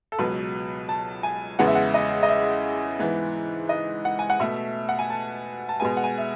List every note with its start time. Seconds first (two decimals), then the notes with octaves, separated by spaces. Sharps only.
0.12 A4
0.19 C#2 B2 F#3 B4
0.89 A5
1.23 G#5
1.59 E2 C#3 G#3 B3 F#5
1.67 E5
1.75 F#5
1.94 D#5
2.23 D#5
2.29 E5
2.99 G#2 E3 B3
3.69 D#5
4.05 F#5
4.19 G#5
4.30 F#5
4.40 B2 A3 E5
4.89 F#5
4.99 G#5
5.10 A5
5.69 A5
5.80 B2 G#3 B3 G#5
5.97 F#5
6.04 G#5
6.18 E5